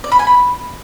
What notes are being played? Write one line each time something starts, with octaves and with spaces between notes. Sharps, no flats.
D5
B5
G#5
B5